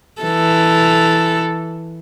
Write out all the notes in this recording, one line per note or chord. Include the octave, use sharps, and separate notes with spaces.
E3 A4